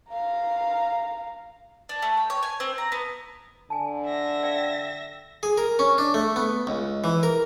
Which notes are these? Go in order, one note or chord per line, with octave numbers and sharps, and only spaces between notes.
F5 A#5
D4
A3
G5
C#5
G#5
C4
A#5
B3
D3 G#5 A5
E5 A#6
D5 F5 G5
G#4
A#4
C#4
D4
A3
B3
C#2
E3
A#4